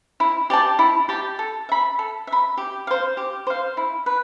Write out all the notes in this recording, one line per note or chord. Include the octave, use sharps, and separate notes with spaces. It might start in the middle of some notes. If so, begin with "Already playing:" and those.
E4
G4 D5 A5
E4
G4 D5 A5
A4
E5 B5
A4
E5 B5
G4
C5 F5
G4
C5 F5
E4
B4